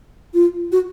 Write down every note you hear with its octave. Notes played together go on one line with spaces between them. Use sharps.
F4
F#4